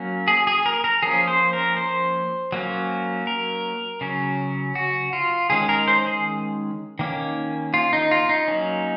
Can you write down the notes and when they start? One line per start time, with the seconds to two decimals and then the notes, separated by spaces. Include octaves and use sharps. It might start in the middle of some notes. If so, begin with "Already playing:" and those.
Already playing: F#3 A#3 C#4
0.28 G#4
0.47 G#4
0.66 A#4
0.84 A#4
1.02 F3 A#3 C#4 G#4
1.28 C5
1.53 A#4
1.77 C5
2.52 F#3 A#3 C#4
3.27 A#4
4.01 C#3 F#3 C#4
4.75 F#4
5.13 F4
5.50 D#3 G#3 C#4 G#4
5.69 A#4
5.88 C5
6.07 G#4
6.99 D#3 A#3 C#4
7.74 F4
7.93 D#4
8.11 F4
8.29 D#4
8.48 F#3 A#3 C#4